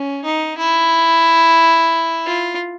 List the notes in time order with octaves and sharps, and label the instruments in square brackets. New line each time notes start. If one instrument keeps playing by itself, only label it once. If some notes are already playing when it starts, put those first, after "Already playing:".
Already playing: [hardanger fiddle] C#4
D#4
E4
F4